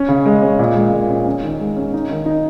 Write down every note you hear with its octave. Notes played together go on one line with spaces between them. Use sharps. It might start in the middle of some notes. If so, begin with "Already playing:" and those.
Already playing: C#4
C#3
G#3
C#4
A#2
G#3
A#2
C#4
C#4
D#3
G#3
C#4
D#4
D#3
D#4